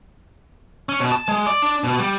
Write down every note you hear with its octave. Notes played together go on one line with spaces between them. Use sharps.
C#4
B2
A5
G#3
D5
D4
B2
G3